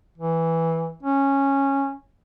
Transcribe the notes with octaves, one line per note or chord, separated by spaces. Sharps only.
E3
C#4